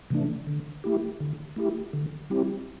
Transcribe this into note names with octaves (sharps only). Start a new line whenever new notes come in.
C3 E3 A3 D4
D3
A3 E4 G4
D3
A3 E4 G4
D3
G3 C4 E4 G4